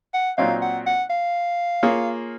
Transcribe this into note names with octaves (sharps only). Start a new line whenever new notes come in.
F#5
A#2 F#3 C4 D#4 F5
F#5
F#5
F5
A#3 F4 G#4 C#5